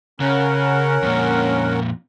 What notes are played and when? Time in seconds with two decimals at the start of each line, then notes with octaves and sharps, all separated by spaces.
0.20 C#3 C#4 A#4 F#5
1.03 F2 A#2